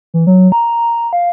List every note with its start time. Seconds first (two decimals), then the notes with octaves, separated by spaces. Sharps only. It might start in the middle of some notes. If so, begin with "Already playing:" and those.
0.14 E3
0.27 F#3
0.52 A#5
1.13 F5